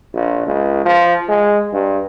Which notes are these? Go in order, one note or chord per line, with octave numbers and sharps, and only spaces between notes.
A#1
C#2
F3
G#3
G2